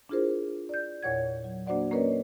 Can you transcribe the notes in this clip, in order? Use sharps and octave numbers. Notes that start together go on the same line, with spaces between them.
D4 E4 F4 G#4 A#4 C5
D5 G6
E2 A#2 C#5 F#5 G#6
F#3
A#3 D4 F#4 C5 D5 F#5
A#3 C#4 A#4 B4 C#5 D#5